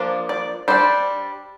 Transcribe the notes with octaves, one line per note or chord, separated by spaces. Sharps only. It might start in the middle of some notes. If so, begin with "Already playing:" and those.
Already playing: F3 A#3 D4
D5
G3 D4 C5